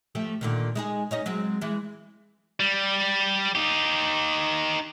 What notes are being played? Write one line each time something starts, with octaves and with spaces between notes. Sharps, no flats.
F3 A3 G4
A#2 D3 D#3
G#3 D#4 G#4
C#4 D#4 D#5
F#3 G#3 C4
E3 G#3
G3
D#4 G4